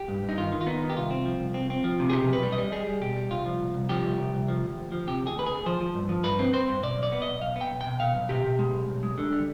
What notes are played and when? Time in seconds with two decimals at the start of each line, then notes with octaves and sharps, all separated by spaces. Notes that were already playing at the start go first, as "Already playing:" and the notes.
Already playing: G4
0.08 G2
0.23 G2
0.29 D#4
0.38 D#3 F4
0.52 D#3
0.61 F4
0.67 B3 D#4
0.81 D#3
0.90 G4
0.96 C2 F4
1.11 C4
1.25 F3
1.40 C2
1.54 C4
1.70 C4
1.84 F3
1.99 C3
2.09 G#4
2.13 B2 G4
2.28 B1
2.33 B4
2.43 G3
2.52 D#5
2.58 G3
2.72 G3 G#4
2.87 G3
3.01 B2 G4
3.16 G3
3.30 C2 F4
3.46 F3
3.60 C2
3.74 C2
3.89 F3 G4
4.05 C2
4.19 C2
4.34 C2
4.48 F3
4.63 D2
4.78 D2
4.92 F3
5.07 C3 G4
5.22 D2
5.27 G#4
5.36 D2 B4
5.46 G#4
5.52 D2
5.66 F3 C5
5.80 F3
5.94 G2
6.09 F3
6.24 G2 B4
6.39 C4
6.53 C4 C5
6.68 G2
6.83 B2 D5
6.97 B1
7.03 D5
7.12 B3
7.22 D#5
7.27 B1
7.41 B1 F5
7.56 B3
7.61 G5
7.71 B1
7.81 G5
7.86 B2
8.00 B2 F5
8.15 B1
8.29 B2 G4
8.44 B2
8.59 G#3
8.73 B1
8.89 B1
9.03 G#3
9.18 D3
9.32 G3